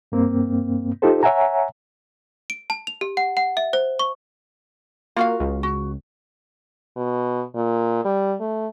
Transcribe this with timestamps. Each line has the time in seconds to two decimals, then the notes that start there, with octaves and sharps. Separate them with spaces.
0.12 G2 A#3 C4
1.02 D#4 F4 G4 A4 C5
1.23 C#5 E5 F#5 G#5 A#5
2.50 D7
2.70 A5
2.87 F7
3.01 G4
3.17 F#5
3.37 F#5
3.57 E5
3.73 C5
3.99 C#6
5.16 A#3 F4 F#4 F5
5.40 C#2
5.63 F#4
6.97 B2
7.55 A#2
8.05 G3
8.40 A3